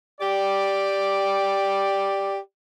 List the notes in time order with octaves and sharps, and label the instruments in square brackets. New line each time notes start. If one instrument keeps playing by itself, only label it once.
[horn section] G4 D5